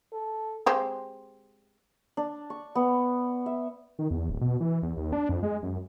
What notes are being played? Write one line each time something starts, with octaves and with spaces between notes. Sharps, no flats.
A4
G#3 C4 G4
D4
C#6
B3
E5
D#3
E2
D1
B2
E3
E2
D#2
D4
F2
G#3
F#2